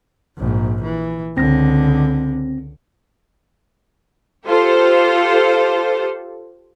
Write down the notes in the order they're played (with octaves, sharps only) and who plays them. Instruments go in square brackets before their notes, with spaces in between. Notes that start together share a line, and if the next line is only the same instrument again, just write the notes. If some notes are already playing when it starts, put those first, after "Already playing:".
[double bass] A#1 G#2
E3
[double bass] C#2 D3 [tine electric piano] C4 A#6
[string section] F4 G4 A4 C5